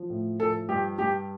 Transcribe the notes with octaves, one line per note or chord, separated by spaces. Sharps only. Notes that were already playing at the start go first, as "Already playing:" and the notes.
Already playing: F3
A2
F3 A4
G2 G4
G2 G4